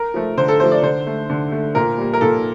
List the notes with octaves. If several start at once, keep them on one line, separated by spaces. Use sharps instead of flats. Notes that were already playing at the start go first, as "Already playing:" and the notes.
Already playing: A#4
F3 A3
D3 C5
A4
F3 A3 C5
D5
D3 C5
A3
D3
A3
A#2 A#4
G3 A#3
A#4
A#2 A4